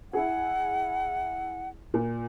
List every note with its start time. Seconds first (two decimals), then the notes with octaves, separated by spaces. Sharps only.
0.13 E4 G#4 F#5
1.94 A#2